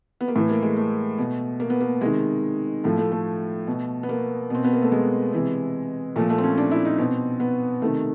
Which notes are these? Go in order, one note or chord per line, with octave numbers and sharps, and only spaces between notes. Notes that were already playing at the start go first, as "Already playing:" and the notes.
B3
A#3
A2 E3 A3
A#3
G#3
A3
B2
A#3
B3
A#3
C3 D#3 G#3
A2 F3 A3
A3
A3
B2
B3
A#3
B2 C4
B3
A#3
A3
G#3
C3 E3
A#2 F3 A3
A3
C4
C#4
D4
E4
D#4
B2 C4
B3
C3 D#3 A3